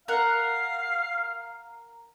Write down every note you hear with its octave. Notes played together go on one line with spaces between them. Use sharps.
A#4 F5 F#5